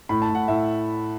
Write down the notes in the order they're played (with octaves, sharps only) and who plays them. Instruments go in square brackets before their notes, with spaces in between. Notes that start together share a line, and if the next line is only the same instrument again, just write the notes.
[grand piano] A2 B5
A5
A2
F#5
A2 E5